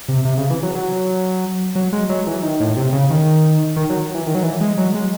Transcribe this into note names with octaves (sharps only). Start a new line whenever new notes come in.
C3
C3
C#3
E3
F#3
F#3
F#3
G#3
F#3
E3
D#3
A2
C3
C#3
D#3
D#3
F#3
E3
D#3
F#3
E3
G#3
F#3
G#3